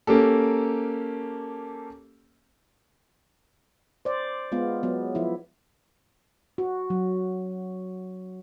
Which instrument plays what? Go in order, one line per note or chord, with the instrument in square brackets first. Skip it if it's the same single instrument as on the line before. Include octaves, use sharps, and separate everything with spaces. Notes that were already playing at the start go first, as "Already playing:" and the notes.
[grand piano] A#3 C#4 G4 A4
[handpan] C5 D5
G#3 B3 F4
F#3 B3
F3 E4
F#4
F#3